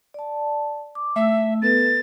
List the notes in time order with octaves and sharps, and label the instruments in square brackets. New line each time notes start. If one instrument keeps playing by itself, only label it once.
[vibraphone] D5 A5
D6
[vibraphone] A3 E6 [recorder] E5
[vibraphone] B3 A4 B4 [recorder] A6